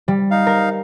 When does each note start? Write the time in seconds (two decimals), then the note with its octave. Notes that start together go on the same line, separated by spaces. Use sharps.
0.08 G3
0.31 D#4 F5
0.47 A#4